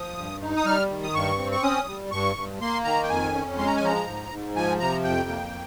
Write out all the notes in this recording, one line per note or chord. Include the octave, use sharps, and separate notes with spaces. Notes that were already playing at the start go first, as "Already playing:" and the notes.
Already playing: F3 D#6
G2
D#4
D#6
G3 F6
D#3
D#6
G2 C#6
C4
C#6
C#4 D#6
G3
G2 C#6
G2
A#3 C6
D#3 A#5
G5
F2 G#5
C#4
G#3 C6
A#5
G#5
F3 A#5
G#2
G#2
F3 G#5
C3 A#5
F2 G5
A#3